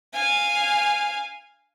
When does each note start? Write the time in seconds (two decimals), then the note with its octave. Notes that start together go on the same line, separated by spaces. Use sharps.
0.14 F5 G#5